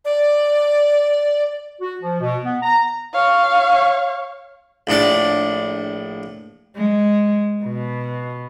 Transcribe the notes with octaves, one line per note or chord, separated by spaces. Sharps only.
D5
F#4
F3
B2
B3
A#5
C#5 F5
A#1 A2 D4 D5
G#3
B2